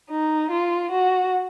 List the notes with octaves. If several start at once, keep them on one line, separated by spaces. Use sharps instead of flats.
D#4
F4
F#4